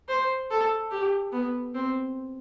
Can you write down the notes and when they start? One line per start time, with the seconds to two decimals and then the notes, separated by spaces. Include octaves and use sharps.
0.09 C5
0.50 A4
0.91 G4
1.32 B3
1.74 C4